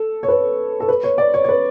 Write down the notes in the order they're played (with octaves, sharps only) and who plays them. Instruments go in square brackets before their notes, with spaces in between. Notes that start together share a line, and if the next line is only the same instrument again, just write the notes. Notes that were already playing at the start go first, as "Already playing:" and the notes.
Already playing: [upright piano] A4
C#5
B4
A4
B4
C#5
D5
C#5
C#5
B4